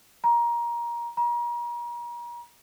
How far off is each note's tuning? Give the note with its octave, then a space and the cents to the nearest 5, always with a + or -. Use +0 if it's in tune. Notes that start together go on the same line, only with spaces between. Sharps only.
A#5 +20
A#5 +40